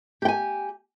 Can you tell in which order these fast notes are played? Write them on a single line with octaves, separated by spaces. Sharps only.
G4 G5 G#5